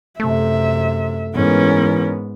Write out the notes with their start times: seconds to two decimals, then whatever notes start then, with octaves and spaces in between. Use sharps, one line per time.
0.20 F#2 C3 A3 E5
1.35 G#2 E3 B3 C#4 A#4